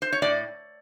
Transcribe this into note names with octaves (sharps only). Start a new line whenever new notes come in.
C5
C#5
A2 D5